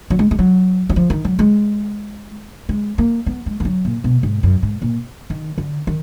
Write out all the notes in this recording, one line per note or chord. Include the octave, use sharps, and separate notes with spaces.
F#3
G#3
G#3
F#3
F#3
F3
D#3
F#3
G#3
G#3
A#3
B3
G#3
F3
F#3
A#2
B2
G#2
F#2
G#2
A#2
D#3
D3
D#3